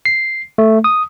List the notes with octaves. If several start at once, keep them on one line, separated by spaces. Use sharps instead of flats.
C7
A3
D#6